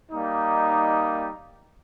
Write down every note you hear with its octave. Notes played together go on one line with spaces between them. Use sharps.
G3 A#3 D#4